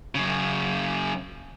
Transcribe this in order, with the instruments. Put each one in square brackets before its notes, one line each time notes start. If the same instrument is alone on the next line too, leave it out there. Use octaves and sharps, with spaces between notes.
[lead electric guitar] F#2 C#3